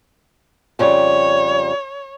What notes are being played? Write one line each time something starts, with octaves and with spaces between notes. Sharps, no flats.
F2 C#3 G3 C#5